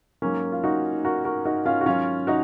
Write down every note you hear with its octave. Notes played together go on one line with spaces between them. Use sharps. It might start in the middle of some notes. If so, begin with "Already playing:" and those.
G#2 F#3 A#3 C#4
F4
D#4 F#4
F#4 A#4
F#4 A#4
D#4 F#4
C#4 F4
F#4
G#2 D#3 F#3 C#4 F4
D#4 F#4